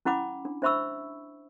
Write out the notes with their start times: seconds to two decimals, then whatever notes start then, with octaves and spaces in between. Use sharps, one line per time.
0.05 C#4 E4 F#5 B5 D6
0.45 D4
0.62 D4 C5 E5 B5 C#6 E6